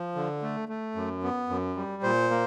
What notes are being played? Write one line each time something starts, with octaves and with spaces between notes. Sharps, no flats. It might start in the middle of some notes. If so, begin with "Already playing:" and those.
Already playing: F3
D3
A3
A3
F#2
B3
F#2
G3
A#2 C5
A#3